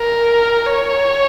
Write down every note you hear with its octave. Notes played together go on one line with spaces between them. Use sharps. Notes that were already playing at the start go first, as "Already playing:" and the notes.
Already playing: A#4
C#5